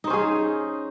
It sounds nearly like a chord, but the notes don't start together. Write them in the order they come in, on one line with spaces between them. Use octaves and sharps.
D#4 C5 C#4 G#4